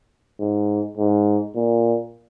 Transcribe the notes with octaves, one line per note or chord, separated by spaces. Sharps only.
G#2
G#2
A#2